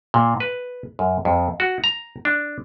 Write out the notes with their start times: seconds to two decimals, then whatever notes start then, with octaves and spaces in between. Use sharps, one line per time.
0.14 A#2
0.40 B4
0.99 F#2
1.25 F2
1.60 F#4
1.84 A#5
2.25 D4